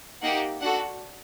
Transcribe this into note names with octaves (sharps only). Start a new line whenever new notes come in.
A#3 D#4 G4 F#5
D4 F#4 A4 F#5